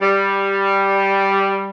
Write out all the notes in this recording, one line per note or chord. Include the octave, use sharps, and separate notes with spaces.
G3